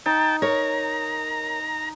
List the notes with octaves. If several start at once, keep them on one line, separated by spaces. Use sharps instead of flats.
D#4 G5 A5
A#4 C#5 A#5